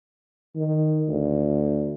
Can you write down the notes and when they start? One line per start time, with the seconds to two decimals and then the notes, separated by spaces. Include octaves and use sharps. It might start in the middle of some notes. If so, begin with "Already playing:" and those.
0.55 D#3
1.08 D2